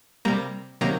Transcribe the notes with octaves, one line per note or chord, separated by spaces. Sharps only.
C3 G3 A#3 A#5
C3 D#3 F#3 A#3 A#5